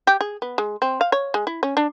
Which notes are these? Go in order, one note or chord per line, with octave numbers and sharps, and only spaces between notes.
G4
G#4
B3
G#3
C4
F5
C#5
G#3
E4
C#4
D4